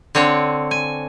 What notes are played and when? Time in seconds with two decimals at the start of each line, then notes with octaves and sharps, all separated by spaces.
0.15 D3 C4 C#5
0.71 G#5